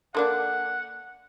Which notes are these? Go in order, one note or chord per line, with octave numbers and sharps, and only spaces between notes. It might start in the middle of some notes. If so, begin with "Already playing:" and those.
D3 A#3 D4 F#5